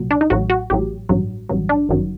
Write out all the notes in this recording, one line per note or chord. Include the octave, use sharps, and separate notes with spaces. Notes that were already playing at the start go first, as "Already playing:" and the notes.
Already playing: C2 A#2 F#3
D4
D#4
A1 A2 F#3 F#4
F#4
A1 A2 F#3 G4
A1 G2 F#3
A1 G2 F#3
D4
G1 F#2 D#3 F#3